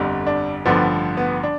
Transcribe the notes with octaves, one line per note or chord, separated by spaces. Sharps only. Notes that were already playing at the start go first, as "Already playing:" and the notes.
Already playing: G1 F2 D3 G3
D4
A1 G2 D3 F3 B3
B3
D4